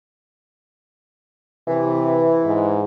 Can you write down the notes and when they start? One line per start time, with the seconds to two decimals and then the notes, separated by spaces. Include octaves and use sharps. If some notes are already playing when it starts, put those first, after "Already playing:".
1.68 C3 E3
2.45 G#2